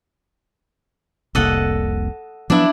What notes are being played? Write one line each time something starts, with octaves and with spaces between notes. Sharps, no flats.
F1 C2 A#3 A4 D#5 F#5
F3 F#3 B3 D4 E4